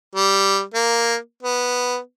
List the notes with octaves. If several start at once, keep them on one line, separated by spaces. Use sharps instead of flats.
G3
A#3
B3